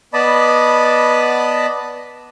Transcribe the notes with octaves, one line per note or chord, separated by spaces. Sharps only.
B3 D5 D#5 A5 B5